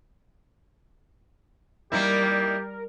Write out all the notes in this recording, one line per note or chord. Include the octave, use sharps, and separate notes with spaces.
G3 A#3 D#4 E4 G4 A#4